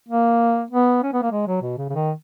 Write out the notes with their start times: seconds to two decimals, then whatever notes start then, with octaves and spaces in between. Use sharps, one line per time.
0.09 A#3
0.70 B3
1.03 C#4
1.13 B3
1.22 A#3
1.32 G#3
1.47 F#3
1.62 B2
1.77 C#3
1.89 C#3
1.93 D#3